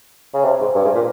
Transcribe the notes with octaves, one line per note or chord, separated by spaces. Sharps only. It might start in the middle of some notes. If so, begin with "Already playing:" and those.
C#3
C3
G#2
G2
G#2
A#2